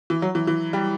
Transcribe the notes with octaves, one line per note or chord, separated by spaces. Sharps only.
E3
F#3
E3
E3
G3